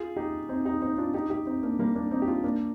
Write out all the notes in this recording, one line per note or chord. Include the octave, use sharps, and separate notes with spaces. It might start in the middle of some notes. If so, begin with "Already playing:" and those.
Already playing: F4 G#4
D#4 G4
C4 D#4
D#4 G4
C4 D#4
D4 F4
D#4 G4
D#4 G4
C4 D#4
A#3 D4
G3 A#3
A#3 D4
C4 D#4
G4
D4 F4
A#3 D4